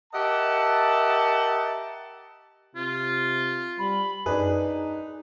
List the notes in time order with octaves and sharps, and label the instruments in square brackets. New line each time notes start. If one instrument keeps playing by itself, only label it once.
[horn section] G4 A#4 D#5 E5 F#5 A5
[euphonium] C3 [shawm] F4
[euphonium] G3 [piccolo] B5
[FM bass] F#2 [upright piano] D4 B4 [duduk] D#4 [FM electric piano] G#4